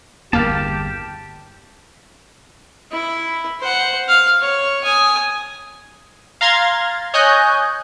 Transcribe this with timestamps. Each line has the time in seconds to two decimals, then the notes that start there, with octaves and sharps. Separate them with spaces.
0.33 G1 E2 A#3 G4 A5 F6
2.92 E4
3.61 C5 F#5
4.08 F5
4.41 C#5
4.84 G#5 D#6
6.41 F5 A#5 C6 G#6 A6
7.14 C#5 D#5 G#5 F#6 G6